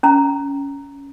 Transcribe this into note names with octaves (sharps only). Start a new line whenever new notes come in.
C#4 A#5